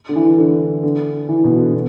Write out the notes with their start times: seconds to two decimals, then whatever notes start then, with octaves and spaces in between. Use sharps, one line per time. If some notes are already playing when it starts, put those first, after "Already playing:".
0.09 D3
0.16 E3
0.38 D3
0.83 D3
1.29 E3
1.44 B2
1.59 D3
1.74 B2